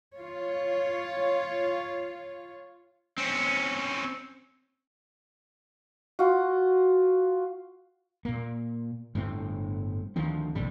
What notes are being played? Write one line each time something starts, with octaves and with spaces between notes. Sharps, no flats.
F4 C#5
C4 C#4
F4 F#4
A#2 A#3
G1 A2 C#3 C4
D2 D#3 F3 C4
A#1 A2 C3 G3